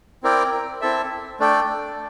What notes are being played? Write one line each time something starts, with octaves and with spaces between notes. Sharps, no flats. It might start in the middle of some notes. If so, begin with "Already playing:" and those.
C4 E4 A#4 D5 G5
C4 E4 A4 E5
A3 D4 A4 D5 G5